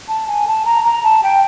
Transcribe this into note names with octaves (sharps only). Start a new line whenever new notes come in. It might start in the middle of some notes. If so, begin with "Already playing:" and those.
A5
G#5
A5
A#5
A#5
A5
G5